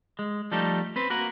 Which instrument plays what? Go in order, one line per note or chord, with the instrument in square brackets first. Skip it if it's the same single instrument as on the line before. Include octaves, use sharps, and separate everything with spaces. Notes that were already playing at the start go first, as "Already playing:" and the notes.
[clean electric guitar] G#3
F3 G3 A3 D#4 G4 A4
C4 B4 C5
A#3 F#4 A#4 B4